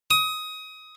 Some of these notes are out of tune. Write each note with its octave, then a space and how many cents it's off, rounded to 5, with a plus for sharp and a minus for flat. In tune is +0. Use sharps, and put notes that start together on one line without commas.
D#6 +20